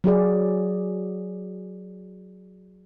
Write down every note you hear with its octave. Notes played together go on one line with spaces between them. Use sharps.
F#3 F#4 G#4 D5